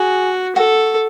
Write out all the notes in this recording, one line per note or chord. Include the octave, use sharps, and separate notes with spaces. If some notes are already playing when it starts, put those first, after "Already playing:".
Already playing: F#4 G#4
F#4 A4